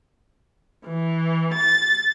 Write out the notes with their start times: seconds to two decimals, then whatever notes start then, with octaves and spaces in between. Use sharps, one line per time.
0.85 E3
1.55 A6